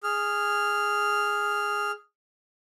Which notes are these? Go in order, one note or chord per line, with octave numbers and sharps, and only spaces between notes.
G#4 F6